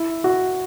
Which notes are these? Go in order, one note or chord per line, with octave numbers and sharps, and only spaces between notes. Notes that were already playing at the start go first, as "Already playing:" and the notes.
Already playing: E4
F#4